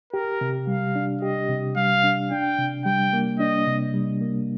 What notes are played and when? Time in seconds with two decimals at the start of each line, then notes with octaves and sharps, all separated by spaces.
0.13 G4 A#4
0.41 C3
0.67 G3 F5
0.96 D4
1.22 G4 D#5
1.49 C3
1.76 G3 F5
2.04 D4
2.31 D4 G5
2.59 C3
2.85 G3 G5
3.13 A#3
3.40 D4 D#5
3.67 C3
3.94 G3
4.21 A#3